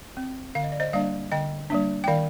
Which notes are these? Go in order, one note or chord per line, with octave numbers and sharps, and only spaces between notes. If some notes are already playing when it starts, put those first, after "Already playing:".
C4
D3 F5
D#5
D5
C5 D#5
G3 A#3 D4 D5 F5
D3 D#5 G5
G3 A#3 D4
G5
D#3 D5 F5